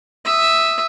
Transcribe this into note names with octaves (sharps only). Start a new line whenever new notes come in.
E5 D#6